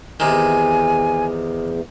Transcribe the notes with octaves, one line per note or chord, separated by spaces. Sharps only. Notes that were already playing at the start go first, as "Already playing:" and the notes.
E2 C3 D#3 G#5